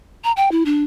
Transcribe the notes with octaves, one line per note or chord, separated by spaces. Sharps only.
A#5
G5
E4
D4